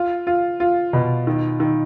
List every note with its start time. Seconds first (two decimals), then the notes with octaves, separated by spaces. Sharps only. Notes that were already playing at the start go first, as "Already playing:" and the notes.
Already playing: F4
0.27 F4
0.60 F4
0.93 B2
1.27 D#3
1.60 D#3